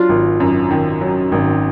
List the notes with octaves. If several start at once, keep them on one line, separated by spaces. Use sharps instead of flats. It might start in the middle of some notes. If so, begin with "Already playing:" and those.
Already playing: F#3 D4 F4
G#1
F#2
D#3
F#3
G#1